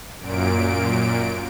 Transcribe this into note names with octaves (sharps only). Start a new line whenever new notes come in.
F#2 A#2 D7